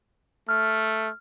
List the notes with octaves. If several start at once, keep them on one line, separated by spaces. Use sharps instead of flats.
A3 F6